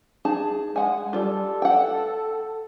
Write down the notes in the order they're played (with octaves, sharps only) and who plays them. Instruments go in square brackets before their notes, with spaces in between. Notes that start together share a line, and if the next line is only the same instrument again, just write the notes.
[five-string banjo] D#4 G#4 A5
[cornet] G#3 [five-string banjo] F#5 G#5
[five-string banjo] G3 F4 [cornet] A4
[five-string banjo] F#5 G5